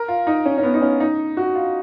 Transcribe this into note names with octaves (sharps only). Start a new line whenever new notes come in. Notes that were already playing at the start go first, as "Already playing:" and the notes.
Already playing: A#4
F4
D#4
C#4
C#4
B3
D#4
C#4
D#4
F#4
F4